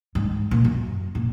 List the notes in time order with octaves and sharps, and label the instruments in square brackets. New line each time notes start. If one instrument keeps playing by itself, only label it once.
[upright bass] G#2
A#2
F#2
A#2